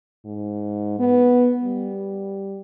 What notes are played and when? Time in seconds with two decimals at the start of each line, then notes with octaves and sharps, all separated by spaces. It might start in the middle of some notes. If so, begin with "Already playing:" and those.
0.25 G#2
0.99 B3
1.64 G3